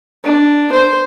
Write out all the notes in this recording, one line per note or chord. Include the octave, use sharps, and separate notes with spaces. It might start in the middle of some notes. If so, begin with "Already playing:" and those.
D4
C5